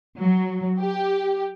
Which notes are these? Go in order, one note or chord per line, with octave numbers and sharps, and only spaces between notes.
F#3
G4